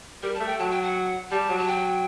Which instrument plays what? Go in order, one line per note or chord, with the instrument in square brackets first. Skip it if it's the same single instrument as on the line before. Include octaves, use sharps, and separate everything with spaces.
[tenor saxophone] G3 [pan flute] A#4
[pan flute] A5
[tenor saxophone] A3
[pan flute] G5
[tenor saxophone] F#3 [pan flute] A5
[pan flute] G5
F#5
[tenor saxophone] G3 [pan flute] A5
[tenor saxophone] F#3
[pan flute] A5
G5